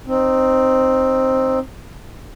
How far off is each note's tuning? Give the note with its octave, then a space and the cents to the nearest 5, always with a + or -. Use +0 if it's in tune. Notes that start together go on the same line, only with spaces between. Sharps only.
C4 +5 D#4 -10